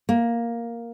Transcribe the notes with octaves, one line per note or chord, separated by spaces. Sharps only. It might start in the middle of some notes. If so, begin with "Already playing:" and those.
A#3